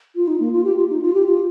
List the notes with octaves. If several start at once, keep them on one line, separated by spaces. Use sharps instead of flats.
F4
D#4
A#3
F4
G4
F4
D#4
F4
G4
F4